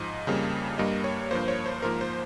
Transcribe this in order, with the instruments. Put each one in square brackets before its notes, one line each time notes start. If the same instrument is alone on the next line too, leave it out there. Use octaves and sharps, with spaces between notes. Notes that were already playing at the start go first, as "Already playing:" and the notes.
Already playing: [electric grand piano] G#2 F3 D#5
F2 C#3 G3 A#3
G2 G3 A#3 D#5
C#5
G2 F3 A#3 C5
C#5
C5
G#2 F3 A#3 A#4
C5